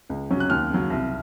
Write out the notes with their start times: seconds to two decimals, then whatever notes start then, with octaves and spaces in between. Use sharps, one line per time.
0.09 C#2
0.30 C3 F#3 C#4
0.40 F#6
0.50 D#2 F6
0.70 C#3 F#3
0.90 C2